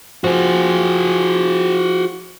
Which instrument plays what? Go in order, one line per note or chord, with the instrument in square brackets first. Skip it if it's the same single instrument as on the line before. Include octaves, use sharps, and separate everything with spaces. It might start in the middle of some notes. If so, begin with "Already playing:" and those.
[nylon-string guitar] F3 [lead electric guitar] F#4 G#4